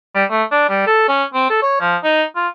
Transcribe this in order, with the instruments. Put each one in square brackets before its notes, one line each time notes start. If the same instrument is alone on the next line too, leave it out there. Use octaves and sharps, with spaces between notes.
[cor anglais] G3
A3
D4
G3
A4
C#4
C4
A4
C#5
F3
D#4
F4